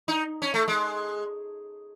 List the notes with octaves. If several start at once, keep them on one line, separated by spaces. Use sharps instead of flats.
D#4
C#4
A3
G#3